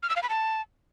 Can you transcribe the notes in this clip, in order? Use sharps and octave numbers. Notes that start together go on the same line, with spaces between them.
F6
E6
F5
B5
A5